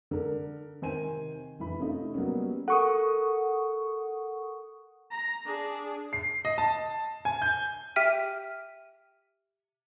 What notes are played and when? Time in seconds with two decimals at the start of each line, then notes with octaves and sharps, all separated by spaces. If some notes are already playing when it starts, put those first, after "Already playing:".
0.11 D3 A#4
0.82 C3 D#3 C5 G#5 D#7
1.59 F1 F#2 E3 B5
1.79 C3 A3 C#4 D#4 F4
2.14 F#3 G3 A#3 B3 C#4
2.68 A4 A#4 F#5 C#6 D#6
5.11 A#5
5.45 D4 G#4
6.13 C7
6.45 D#5
6.58 A5
7.25 G#5
7.42 G6
7.96 G4 E5 G5 F6 B6 D#7